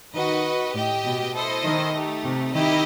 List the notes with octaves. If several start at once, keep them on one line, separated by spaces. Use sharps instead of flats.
D#3 F#4 B4 D#5
A2 G4 D#5 G5
B2
E4 A4 C5 D#5
D#3
A3 D#4 G4
C3
D#3 E4 G4 D#5 G5